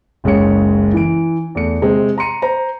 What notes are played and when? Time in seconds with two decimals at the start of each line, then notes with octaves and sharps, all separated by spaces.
0.24 F#1 C#2 G#3 C#5 C#7
0.93 E3 D7
1.55 E2 A3 C#7
1.82 C3 G#3 C4
2.18 A#5 C6 C#7 D#7
2.42 C5 A#5